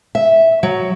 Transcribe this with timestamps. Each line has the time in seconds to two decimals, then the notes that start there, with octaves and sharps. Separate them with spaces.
0.15 E5
0.63 F#3